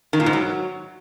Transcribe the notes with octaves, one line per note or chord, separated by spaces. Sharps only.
D#3
A#2
G#2
F#3